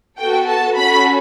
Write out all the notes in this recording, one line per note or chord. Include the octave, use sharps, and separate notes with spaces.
B3 F#4 A4 G5
A5
C#4 F#4 A4 B5